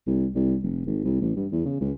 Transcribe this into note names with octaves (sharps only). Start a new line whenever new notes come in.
C2
C2
F1
G#1
C2
A1
G2
E2
C#3
C#2